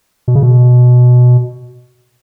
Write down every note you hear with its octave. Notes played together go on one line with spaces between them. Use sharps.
B2
C#3
B2